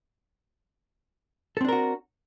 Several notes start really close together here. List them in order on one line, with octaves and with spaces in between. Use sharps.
A4 C4 D4 A#4 F#4